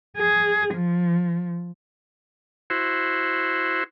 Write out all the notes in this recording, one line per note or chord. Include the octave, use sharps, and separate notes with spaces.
G#4
F3
E4 F#4 C5